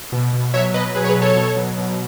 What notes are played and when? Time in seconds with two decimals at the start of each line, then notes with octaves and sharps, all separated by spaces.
0.12 B2
0.33 B2
0.54 F#3 C#5 E5
0.74 B2 B4 D#5
0.95 F#3 G#4 B4
1.04 C#5
1.09 G#4 B4
1.15 B2
1.22 A4 C#5
1.36 B2
1.57 F#3
1.77 B2